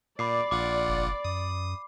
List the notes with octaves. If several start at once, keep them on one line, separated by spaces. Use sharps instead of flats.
A#2 D5 B5 D6 C7
A#1 F4 F#5 D6
F#1
F#2 D#6